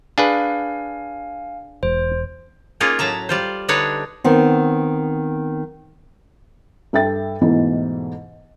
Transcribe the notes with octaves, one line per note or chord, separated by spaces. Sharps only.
D4 G#4 B4 F5 G#5
E1 C5
A#3 C#4 D#4 F4 G#4 D5
A2 F#3 E5 A5 A#5
G3 F4 C5
D3 D4 D#4 B4 C#5
D#3 B3 C4
G2 A4 E5 G5 A6
E2 G#2 B2 E3 A3